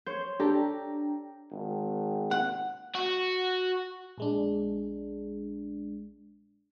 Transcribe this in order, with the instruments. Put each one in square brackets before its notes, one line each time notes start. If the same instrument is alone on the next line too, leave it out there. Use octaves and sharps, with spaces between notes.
[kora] C5 C#5 [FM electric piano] G6
[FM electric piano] D4 G5 A#5 [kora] G4 [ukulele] A4
[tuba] G#1
[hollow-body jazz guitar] F#5
[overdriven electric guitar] F#4
[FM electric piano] A#1 G#3 D4